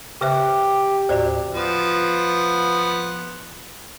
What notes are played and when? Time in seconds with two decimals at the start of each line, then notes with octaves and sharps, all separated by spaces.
0.21 C#3 G4 B4 C5 E5 F#6
1.09 D#2 A2 F#4 C5 D5
1.52 F3 B3